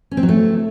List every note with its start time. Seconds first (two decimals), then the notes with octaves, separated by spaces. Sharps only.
0.11 C#4
0.17 C4
0.23 F#3
0.29 A3